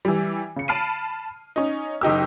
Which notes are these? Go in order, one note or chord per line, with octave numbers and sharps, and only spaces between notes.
E3 G3
C#3 C#7
A5 B5 F6 C7 D7 D#7
C#4 D#4
F#1 D#4 G4 E6